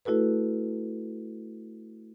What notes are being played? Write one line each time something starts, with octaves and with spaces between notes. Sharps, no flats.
A3 E4 F#4 A4 B4